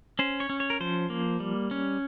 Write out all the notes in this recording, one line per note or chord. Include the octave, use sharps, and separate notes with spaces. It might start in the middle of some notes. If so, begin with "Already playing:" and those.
C#4 C5
C#5
C#4
C#5
A#4
F3 C5
A#3
G3
C#4